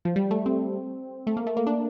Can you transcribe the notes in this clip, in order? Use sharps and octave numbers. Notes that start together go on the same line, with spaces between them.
F3
G3
A3
C4
A3
A#3
A3
A#3
D4